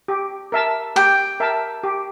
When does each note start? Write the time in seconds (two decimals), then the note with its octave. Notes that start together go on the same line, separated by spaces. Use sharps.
0.08 G4
0.52 A#4 E5 A5
0.96 G4 G5
1.40 A#4 E5 A5
1.83 G4